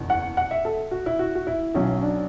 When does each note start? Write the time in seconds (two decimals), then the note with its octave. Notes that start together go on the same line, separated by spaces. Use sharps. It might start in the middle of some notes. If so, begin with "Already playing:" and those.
Already playing: F#1 E2 B2
0.10 F#5
0.37 F#5
0.51 E5
0.65 A4
0.91 F#4
1.06 E4
1.19 F#4
1.35 F#4
1.47 E4
1.75 B1 B2 F#3 C#4
2.02 D4